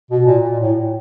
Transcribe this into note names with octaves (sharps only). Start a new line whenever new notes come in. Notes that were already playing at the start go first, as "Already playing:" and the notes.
B2
A#2
A#2
A2